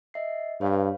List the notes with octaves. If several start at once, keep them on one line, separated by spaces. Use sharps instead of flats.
D#5 E5 C7
G2 B4 C#5 F5